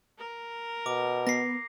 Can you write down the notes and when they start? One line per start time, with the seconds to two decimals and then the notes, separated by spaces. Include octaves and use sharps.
0.18 A#4
0.86 B2 D6
1.27 B3 A#6 C7